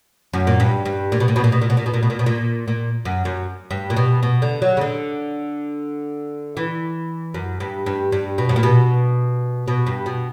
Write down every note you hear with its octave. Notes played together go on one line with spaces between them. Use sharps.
F#2
A#2
G2
G2
A#2
B2
A#2
B2
A#2
B2
A#2
B2
A#2
B2
A#2
B2
A#2
B2
A#2
A#2
F#2
F#2
G2
A#2
B2
B2
D3
F#3
C#3
D3
E3
F#2
G2
G2
G2
B2
G2
A#2
B2
B2
G2
B2